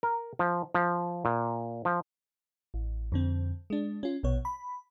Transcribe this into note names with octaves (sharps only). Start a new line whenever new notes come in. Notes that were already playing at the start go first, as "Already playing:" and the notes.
A#4
F3
F3
A#2
F3
A1
F2 D3 C4
G#3 D4
C#4 F4
A#1 B2 B3 C#5
B5